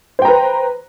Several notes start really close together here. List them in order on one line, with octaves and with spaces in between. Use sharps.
C5 G5 A#5 B4